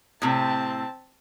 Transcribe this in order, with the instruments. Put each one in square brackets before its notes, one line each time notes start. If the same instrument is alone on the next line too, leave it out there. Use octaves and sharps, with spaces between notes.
[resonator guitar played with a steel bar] A2 C3 [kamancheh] C4 A5